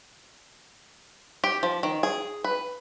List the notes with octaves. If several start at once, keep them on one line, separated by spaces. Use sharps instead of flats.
G4
F3
D#3
G#4
B4